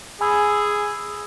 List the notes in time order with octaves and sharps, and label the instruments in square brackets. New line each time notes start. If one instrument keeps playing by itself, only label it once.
[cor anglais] G#4 [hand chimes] G#5 B5 E6